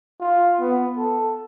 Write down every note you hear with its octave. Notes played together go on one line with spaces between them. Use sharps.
F4
B3
A4